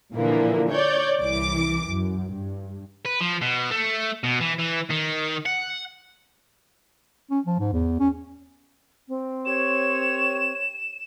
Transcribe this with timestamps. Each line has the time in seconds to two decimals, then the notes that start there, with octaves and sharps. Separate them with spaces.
0.13 A#2 D3 E3 F3 A#3
0.70 C#5 D5 G6
1.19 C2 E3 D6
1.87 F#2
2.32 G2
3.05 B4
3.20 F3
3.41 B2
3.71 A3
4.24 B2
4.41 E3
4.59 E3
4.90 D#3
5.46 F#5
7.31 C#4
7.46 F3
7.59 G#2
7.73 E2
8.00 C#4
9.09 C4
9.45 G4 A#4 C#5 E7